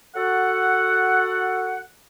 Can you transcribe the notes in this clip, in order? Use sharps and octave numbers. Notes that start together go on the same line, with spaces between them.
F#4 A4 F#5